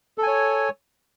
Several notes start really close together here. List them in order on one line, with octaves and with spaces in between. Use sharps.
A4 G#5 C#5